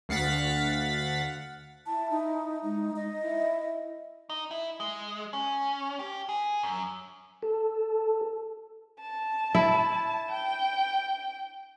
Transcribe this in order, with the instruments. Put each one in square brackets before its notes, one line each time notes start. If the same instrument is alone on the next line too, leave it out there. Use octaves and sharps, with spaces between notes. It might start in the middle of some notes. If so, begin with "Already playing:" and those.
[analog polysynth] D2 F5 F#5 A6 B6
[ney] E4 [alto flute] A5
[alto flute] D#4
[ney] G#3 [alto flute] D#4
[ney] D#4 [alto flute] D#5
[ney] E4
[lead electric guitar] D#4
E4
G#3
C#4
G4
G#4
F#2
[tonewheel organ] A4
[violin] A5
[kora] E4
[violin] G5